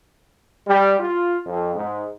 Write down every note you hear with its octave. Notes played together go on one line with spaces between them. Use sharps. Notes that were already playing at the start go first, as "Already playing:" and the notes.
G3
F4
F2
G#2